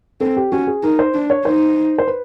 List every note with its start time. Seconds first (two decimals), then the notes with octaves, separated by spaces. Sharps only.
0.21 C4 A4
0.37 G4
0.52 C#4 F#4
0.67 G#4
0.83 D#4 A#4
0.99 C5
1.14 D4
1.30 C#5
1.45 D#4 C5
1.98 C5
2.08 B4